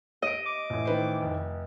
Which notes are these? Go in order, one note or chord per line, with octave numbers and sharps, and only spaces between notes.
D#5 D7 D#7
D6
A1 A2
D#3 B4 C5
F1